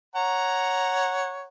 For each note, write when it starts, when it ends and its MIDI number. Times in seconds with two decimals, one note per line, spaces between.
0.16 1.48 73
0.16 1.48 78
0.16 1.48 82